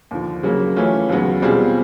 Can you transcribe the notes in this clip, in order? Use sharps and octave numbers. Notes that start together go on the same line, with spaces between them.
D#2 D3 F3
C#3 F#3 A#3
E3 A3 C#4 F4
D#2 C#3 F#3 B3
B2 G3 C4 F4 G#4